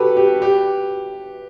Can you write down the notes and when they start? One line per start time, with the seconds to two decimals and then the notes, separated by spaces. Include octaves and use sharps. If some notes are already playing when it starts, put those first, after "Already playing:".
Already playing: F#4 G4 A4 B4
0.17 G4
0.42 G4